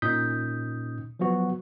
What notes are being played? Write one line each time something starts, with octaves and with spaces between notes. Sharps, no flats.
A#2 C#4 D#4 D#6 G6 B6
F3 F#3 B3 F#4